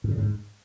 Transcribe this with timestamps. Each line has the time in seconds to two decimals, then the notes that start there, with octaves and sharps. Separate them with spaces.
0.04 G#2
0.11 C#3
0.17 G#2